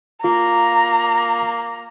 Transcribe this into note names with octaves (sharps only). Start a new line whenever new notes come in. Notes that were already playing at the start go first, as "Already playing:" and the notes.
A#3 F4 A#5